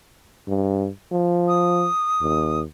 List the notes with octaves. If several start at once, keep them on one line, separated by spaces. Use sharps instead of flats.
G2
F3
D#6
D#2